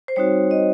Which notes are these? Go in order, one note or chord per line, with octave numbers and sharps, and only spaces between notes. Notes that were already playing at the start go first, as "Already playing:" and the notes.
C5
G3 C4 D#4 F#4 C#5
D#5